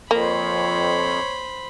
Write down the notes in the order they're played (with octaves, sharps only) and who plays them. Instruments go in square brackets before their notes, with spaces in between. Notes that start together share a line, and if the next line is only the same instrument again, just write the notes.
[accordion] F2 [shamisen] A#3 [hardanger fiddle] C5 B5 [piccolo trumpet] C#5